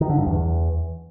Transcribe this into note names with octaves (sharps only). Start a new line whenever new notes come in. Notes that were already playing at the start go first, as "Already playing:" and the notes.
D#3
D3
G2
E2